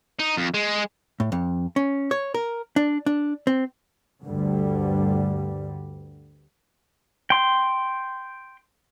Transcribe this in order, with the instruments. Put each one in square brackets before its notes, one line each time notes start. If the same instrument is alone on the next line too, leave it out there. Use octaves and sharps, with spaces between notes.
[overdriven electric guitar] D#4
F2
G#3
[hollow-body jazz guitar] A2
F2
C#4
C#5
A#4
D4
D4
C4
[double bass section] D2 G2 D3 G3
[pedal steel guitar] G5 C6